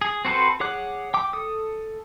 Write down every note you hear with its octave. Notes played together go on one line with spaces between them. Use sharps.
G#4
C4 F#4 A4 B4 C5
G#4 C#5 F#5 D6 F#6
G5 D6
A4 D#6